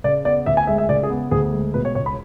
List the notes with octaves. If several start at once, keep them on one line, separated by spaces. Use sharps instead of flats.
C#3 D5
B3 D5
D2 E5
G#5
G#3 E5
E5
C#3 D5
G#4
B3
D2 G#4
G#3
B2 B4
C#5
C#2 C#5
B5